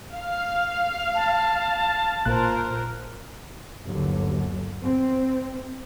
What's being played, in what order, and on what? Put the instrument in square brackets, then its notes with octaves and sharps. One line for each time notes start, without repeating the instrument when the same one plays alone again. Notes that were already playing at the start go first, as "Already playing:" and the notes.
[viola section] F5
[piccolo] A5
[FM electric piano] A1 A#2 F#6 [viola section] F4 A#4 C5
[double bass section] G1 D#2 D3 F#3
C4